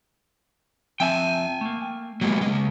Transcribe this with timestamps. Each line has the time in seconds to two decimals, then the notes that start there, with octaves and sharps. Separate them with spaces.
1.00 F3 C4 E5 G5 G#5
1.61 A3 A#3
2.21 F#3 G#3 A#3 B3
2.41 C#3 G#3